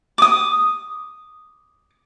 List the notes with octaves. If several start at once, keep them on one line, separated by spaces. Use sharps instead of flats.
D6 D#6